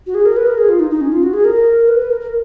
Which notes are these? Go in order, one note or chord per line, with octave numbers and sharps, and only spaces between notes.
F#4
G#4
A#4
B4
A#4
G#4
F4
D#4
D#4
C#4
F4
F#4
G#4
A#4
B4
B4
A#4
A#4